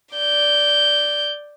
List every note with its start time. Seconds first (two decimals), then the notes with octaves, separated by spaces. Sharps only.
0.15 D5 G6